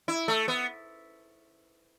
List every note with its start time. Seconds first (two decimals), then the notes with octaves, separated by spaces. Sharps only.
0.08 E4
0.28 A3
0.48 B3